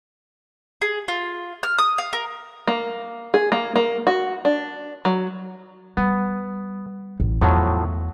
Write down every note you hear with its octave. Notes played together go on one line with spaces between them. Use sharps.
G#4
F4
F6
D#6
F5
A#4
A#3
G#4
A#3
A#3
F#4
D4
F#3
G3 B3
A1
E2 A2 F3 F#3